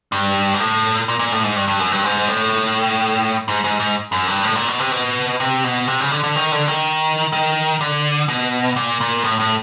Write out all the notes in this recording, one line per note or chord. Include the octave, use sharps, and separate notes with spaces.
G2
G#2
A2
A#2
A#2
A2
G#2
G2
G2
F#2
G2
G#2
A2
G#2
G#2
G#2
F#2
G2
A2
A#2
B2
C3
B2
C3
B2
C3
C#3
D3
D3
D#3
D3
D#3
D#3
D3
B2
A#2
A#2
A2
A2